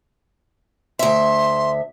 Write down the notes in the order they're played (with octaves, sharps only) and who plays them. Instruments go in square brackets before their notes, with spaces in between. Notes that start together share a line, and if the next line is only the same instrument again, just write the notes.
[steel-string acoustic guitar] D2 E5 [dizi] C6